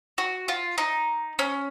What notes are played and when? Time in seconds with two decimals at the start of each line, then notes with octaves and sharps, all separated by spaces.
0.18 F#4
0.48 F4
0.78 D#4
1.39 C#4